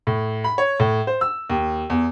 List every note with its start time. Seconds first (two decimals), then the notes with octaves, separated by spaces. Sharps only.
0.07 A2
0.44 B5
0.58 C#5
0.80 A2
1.07 C5
1.21 E6
1.49 D#2
1.90 E2